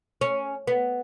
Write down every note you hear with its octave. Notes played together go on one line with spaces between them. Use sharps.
C#4
B3